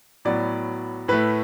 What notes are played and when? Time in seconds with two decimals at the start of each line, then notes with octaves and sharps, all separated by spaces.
0.25 A2 F#3 B3 D5
1.08 A2 A3 B4